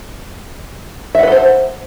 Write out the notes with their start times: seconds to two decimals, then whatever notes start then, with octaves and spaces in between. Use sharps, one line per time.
1.15 E5
1.19 F#5
1.23 B4
1.28 A4
1.32 C5